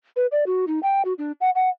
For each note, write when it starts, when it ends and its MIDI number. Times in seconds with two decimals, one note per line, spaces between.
0.16 0.27 71
0.32 0.44 74
0.46 0.65 66
0.67 0.80 63
0.83 1.02 79
1.05 1.13 66
1.18 1.32 62
1.41 1.50 78
1.55 1.69 78